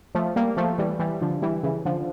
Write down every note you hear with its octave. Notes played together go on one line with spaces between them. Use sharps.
F3 A3
G3 A#3
F3 A3
E3 G3
E3 G3
D3 F3
E3 G3
C#3 E3
D3 F3